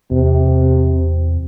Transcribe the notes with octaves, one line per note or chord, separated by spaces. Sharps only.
E2 C3